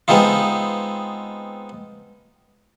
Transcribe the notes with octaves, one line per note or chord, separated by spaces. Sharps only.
G#3 B3 C4 D#4 F4